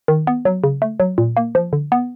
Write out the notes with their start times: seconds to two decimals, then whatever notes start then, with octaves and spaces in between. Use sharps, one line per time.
0.08 D#3
0.27 B3
0.45 F#3
0.64 C#3
0.82 A3
1.00 F#3
1.18 A#2
1.37 A#3
1.55 F3
1.73 D3
1.92 B3